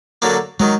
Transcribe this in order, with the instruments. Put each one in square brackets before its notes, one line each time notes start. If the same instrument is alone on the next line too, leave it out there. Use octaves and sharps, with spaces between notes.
[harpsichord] D3 F#3 A#3
[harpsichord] D#3 F#3 [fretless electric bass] G#3